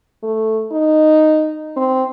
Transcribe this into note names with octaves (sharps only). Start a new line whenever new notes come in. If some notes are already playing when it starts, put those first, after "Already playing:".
A3
D#4
C4